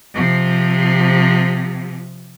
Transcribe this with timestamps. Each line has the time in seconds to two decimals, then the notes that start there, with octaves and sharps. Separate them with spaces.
0.15 C3 F3